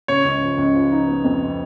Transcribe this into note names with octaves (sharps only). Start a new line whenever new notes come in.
C#3 C#5
C#2
F3
C#2
F3
D#4
B3
F2